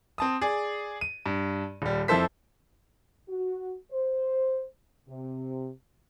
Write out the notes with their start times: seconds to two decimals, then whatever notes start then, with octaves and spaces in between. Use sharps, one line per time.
0.18 C4 A5 D#6
0.42 G#4 D5
1.01 D#7
1.26 G2
1.82 D#1 G3
2.08 F2 F3 E4 A4 C5 B6
3.29 F#4
3.91 C5
5.08 C3